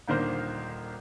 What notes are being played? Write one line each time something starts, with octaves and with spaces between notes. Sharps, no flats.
D#1 D3 D#3 A#3 C5